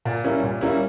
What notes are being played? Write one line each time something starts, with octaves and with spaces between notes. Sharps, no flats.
A#2
G3 A#3 C#4 E4
A#2
G3 A#3 C#4 E4